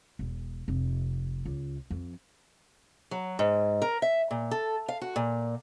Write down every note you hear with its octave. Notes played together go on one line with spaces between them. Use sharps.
E1
F1
C#2
F2
F#3
G#2
A#4
E5
A#2
A4
F5
F#4
A#2